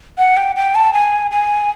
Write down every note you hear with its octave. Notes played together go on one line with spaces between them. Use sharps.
F#5
G5
G5
A5
G#5
G#5